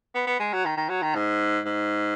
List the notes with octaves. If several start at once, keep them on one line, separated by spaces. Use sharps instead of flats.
B3
B3
G#3
F#3
D#3
D#3
F#3
D#3
G#2
G#2